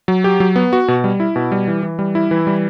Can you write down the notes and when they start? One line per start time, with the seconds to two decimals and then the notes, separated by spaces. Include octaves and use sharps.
0.08 F#3
0.24 G4
0.40 F#3
0.56 B3
0.73 F#4
0.88 B2
1.04 G3
1.20 E4
1.36 B2
1.52 G3
1.68 E3
1.83 E3
1.99 G3
2.15 E4
2.31 E3
2.47 G3